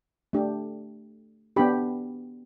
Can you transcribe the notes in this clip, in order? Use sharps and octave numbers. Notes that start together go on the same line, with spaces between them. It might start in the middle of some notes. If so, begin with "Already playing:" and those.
A3 D4 G4
B3 D4 G4 B5